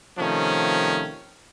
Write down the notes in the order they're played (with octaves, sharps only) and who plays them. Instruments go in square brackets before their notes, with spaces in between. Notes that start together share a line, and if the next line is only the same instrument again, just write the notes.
[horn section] C3 D#3 F3 A3 C#4